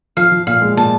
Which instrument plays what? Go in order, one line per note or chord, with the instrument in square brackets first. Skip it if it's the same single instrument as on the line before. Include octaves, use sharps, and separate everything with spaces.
[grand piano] F3 [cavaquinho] F5
[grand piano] F3
[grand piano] A#2 [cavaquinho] F5
[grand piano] G#3
[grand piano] A#2 [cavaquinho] A5